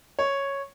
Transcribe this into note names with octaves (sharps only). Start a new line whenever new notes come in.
C#5